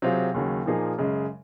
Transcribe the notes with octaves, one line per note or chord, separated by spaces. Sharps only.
C3 F#3 C4 F4 G#4
D#2 C#3 F#3
A#2 F3 A#3 D#4 G#4
F#2 C#3 G#3